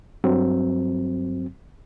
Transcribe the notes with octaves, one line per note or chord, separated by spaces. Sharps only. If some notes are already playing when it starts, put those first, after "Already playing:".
G2 F#3 C4